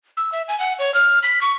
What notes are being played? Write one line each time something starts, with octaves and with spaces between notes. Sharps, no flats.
E6
E5
G#5
F#5
C#5
F6
B6
C#6